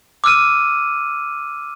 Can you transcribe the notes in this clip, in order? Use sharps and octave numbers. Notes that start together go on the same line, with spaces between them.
D6 E6 F6 D#7